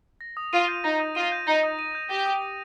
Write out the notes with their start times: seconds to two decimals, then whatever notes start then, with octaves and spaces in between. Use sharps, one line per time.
0.21 A#6
0.37 D#6
0.53 F4 D#7
0.68 G6
0.84 D#4 A#6
1.00 D#6
1.15 F4 D#7
1.32 G6
1.47 D#4 A#6
1.63 D#6
1.79 D#7
1.95 G6
2.10 G4 A#6
2.26 D#6
2.42 D#7